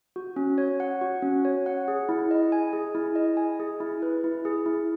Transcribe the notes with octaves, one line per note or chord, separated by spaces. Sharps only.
F#4
C#4
C#5
F#5
F#4
C#4
C#5
F#5
G#4
E4
D#5
G#5
G#4
E4
D#5
G#5
G#4
E4
B4
E4
G#4
E4